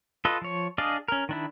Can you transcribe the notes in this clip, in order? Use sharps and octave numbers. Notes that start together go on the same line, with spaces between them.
F4 A4 B4 D#5
F3 C#5
D4 G#4 D5 D#5 F5
C#4 A#4
D#3 D4 E4